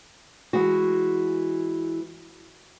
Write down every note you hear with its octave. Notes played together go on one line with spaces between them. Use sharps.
E3 G#3 F#4